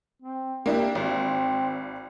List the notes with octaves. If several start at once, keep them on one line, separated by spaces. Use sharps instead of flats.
C4
A#3 D4 E4 G4
G#1 C4